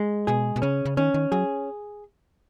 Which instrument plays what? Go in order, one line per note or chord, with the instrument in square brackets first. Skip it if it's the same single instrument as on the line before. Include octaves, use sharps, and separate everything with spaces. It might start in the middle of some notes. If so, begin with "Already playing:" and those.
Already playing: [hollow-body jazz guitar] G#3
[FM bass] B2 [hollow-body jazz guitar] G#4
[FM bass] B2
[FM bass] C#3 [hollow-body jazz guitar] C#4
[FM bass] C#3
[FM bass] D#3 [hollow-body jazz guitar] C#4
[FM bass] D#3
[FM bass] F#3 [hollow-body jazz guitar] G#4